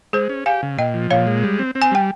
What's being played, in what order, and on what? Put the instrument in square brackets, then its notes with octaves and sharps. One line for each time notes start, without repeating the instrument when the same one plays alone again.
[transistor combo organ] G#3 [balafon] G#4 C5
[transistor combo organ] C#4
[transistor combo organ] G4 [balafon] F5 G#5
[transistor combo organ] C#3
[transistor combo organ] A#2 [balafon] D#5 G5
[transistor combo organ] F3
[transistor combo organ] A#2 [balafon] C#5 F5
[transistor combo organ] G#3
G3
C4
C4
[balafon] G#5
[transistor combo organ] G3 [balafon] G5